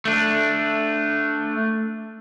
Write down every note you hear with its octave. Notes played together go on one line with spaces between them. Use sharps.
A3 D4